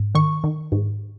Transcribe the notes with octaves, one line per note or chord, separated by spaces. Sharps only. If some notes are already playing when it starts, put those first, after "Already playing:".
Already playing: G#2
D#3 C#6
D#3
G#2